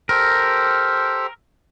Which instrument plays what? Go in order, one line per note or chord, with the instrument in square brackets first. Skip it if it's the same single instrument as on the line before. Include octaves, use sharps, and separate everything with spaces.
[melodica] G4 A4 C5 [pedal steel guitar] A#4